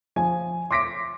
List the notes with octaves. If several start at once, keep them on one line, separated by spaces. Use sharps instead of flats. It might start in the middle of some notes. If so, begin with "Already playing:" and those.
F3 G#5
C6 D6 A#6 B6 D7